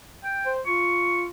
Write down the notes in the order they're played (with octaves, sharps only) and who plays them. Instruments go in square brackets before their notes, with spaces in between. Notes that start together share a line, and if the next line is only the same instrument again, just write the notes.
[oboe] G5
[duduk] C5
[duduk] F4 [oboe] C#6